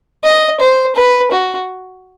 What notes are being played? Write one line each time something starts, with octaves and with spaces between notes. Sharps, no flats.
D#5
C5
B4
F#4